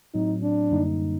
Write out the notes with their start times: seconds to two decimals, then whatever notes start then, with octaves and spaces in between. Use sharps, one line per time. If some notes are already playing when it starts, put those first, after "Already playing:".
0.14 A2 F#3 C4 D#4
0.43 D4
0.71 F#2 D3 G3 A#3 D#4